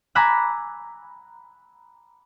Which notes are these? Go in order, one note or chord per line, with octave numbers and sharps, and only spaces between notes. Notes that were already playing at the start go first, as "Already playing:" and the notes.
G#5 A#5 B5 D6 E6 F#6